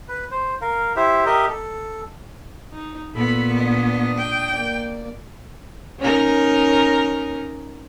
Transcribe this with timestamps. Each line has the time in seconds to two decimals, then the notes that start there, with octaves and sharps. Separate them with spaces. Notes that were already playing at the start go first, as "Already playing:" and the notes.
0.08 B4
0.31 C5
0.61 A#4 F5
0.96 E4 G4 C5 E5
1.26 G4 A#4 D#5 E5
1.49 A4
2.72 D#4
3.14 A#2 B3 A4 B5
3.57 D4 D#5
4.18 G5
4.54 A#3 D5
6.00 C#4 D#4 A#4